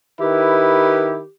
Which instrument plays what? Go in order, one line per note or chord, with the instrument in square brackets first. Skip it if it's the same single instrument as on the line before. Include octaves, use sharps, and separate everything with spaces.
[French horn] D#3 [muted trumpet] E4 [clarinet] G4 [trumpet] B4